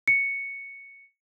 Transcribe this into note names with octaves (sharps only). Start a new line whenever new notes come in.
C#7